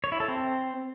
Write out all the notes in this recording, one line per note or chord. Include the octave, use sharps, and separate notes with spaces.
C#5
E4
A4
C4